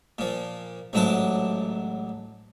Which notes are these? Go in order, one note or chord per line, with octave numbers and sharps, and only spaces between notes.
A#2 F3
A1 G#2 F#3 D4 E4 A5